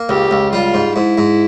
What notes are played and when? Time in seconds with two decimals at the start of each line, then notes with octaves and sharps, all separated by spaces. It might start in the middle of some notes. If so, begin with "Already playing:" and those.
Already playing: A#3
0.09 C#2 G4
0.31 C#2
0.53 G3 F4
0.74 G#2
0.96 G#2 E4
1.18 G#2